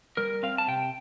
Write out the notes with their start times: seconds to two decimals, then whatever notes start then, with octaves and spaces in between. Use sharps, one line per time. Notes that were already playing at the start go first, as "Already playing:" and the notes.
0.17 G3 A#4
0.43 C4 F5
0.58 A5
0.68 C3 G5